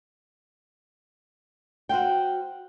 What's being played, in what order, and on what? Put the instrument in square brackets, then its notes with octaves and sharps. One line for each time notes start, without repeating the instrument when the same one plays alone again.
[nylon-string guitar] F#4 C5 F5 G5